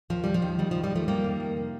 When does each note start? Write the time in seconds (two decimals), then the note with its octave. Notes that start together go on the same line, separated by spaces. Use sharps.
0.10 D#2 F3
0.24 D#2 G3
0.34 F3
0.42 D#3
0.59 D#3 G3
0.71 F3
0.75 D#2
0.84 G3
0.91 D#2 F3 A3
1.08 F2 G3 A#3
1.24 D#3
1.40 F2
1.57 C3